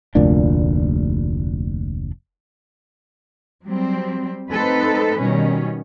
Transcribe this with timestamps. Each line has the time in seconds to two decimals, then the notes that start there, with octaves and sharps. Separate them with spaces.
0.15 F1 D2 A#2 D4
3.65 F#3 G3 C4
4.49 A3 C4 D#4 A4 B4
5.19 B2 D#3 G3 C#4